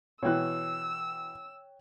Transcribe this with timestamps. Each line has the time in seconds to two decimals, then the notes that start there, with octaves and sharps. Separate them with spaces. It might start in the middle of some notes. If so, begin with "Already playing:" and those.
0.23 B2 E3 C#5 G5 E6 F#6